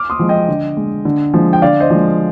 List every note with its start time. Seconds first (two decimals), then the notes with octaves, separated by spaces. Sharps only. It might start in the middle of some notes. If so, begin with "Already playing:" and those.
Already playing: D6 F6
0.10 C6 D#6
0.19 F3 G#3
0.29 D#5 G5
0.48 D3
0.77 G#3
1.05 D3
1.34 F3 G#3
1.53 G5
1.62 D3 D5 F5
1.80 C5 D#5
1.90 F3 G#3